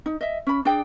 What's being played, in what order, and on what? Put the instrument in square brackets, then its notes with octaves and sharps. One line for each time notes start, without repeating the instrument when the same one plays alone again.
[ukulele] D#4
D#5 E5
C#4 B5
D4 G#4 D5 G5